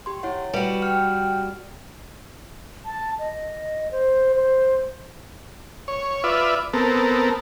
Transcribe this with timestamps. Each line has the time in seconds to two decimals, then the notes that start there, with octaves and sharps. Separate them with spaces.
0.06 G4 C6
0.23 E4 C#5 F#5
0.54 G3 F#4 B4
0.82 G5 F6
2.85 A5
3.19 D#5
3.91 C5
4.36 C5
5.88 C#5
6.24 F4 B4 D5 E5
6.73 B3 C4 A4 A#4